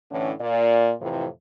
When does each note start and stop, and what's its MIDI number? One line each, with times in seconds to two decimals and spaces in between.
0.10 0.32 45
0.10 0.32 50
0.10 0.32 52
0.10 0.32 61
0.39 0.92 46
0.39 0.92 74
0.99 1.27 41
0.99 1.27 45
0.99 1.27 48
0.99 1.27 52